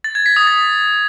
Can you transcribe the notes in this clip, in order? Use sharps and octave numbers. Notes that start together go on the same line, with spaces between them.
A6
G#6
B6
D#6
A6